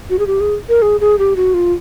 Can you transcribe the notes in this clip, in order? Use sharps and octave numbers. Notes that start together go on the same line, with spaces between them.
F#4
G#4
G4
G#4
A#4
G#4
G#4
G4
F#4
F4